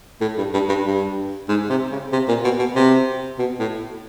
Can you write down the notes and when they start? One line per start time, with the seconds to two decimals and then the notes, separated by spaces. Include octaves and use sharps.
0.21 A2
0.38 G2
0.54 G2
0.69 G2
0.86 G2
1.49 G#2
1.70 C3
1.92 C#3
2.13 C3
2.28 A#2
2.44 B2
2.59 B2
2.76 C3
3.39 B2
3.60 A2